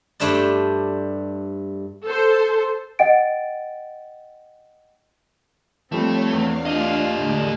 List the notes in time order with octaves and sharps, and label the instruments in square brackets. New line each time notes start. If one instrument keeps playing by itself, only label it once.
[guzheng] G2 A3 D4 C5 D5
[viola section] A4 C5
[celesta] D#5 F#5 G5 A6 D7
[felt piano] F3 G3 [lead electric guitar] A3 [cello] C4 [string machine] C#5
[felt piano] E2 [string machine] D4 F5
[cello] A3 F4 [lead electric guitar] G4 D#5
[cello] A2 [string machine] D3 G#3 D4